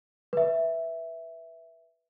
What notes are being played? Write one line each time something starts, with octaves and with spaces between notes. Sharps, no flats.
B4 E5